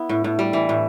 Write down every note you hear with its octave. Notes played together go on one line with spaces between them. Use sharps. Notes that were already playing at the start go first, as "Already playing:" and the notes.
Already playing: B3 E4
A2
A2
G3
E3
A2